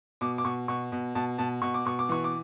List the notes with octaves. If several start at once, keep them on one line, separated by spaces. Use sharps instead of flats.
B2 D6
D6
B2 C#6
B2 C#6
B2
B2 A5
B2 A5
B2 C#6
D6
B2 C#6
D6
E3 C#6
D6